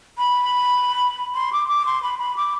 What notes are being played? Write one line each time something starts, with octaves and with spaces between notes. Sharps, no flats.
B5
C6
D6
D6
C6
B5
B5
D6